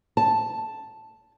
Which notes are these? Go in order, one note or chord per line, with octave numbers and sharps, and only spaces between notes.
A5